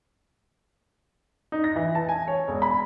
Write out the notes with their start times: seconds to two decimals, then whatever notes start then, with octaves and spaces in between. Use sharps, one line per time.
1.52 D#4
1.64 A#6
1.76 E3
1.95 A5
2.09 G#5
2.28 C#5
2.48 E1
2.62 B5